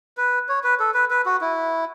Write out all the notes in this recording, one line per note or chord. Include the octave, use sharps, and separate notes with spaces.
B4
C#5
B4
A4
B4
B4
F#4
E4